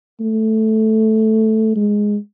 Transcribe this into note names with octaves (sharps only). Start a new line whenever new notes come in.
A3
G#3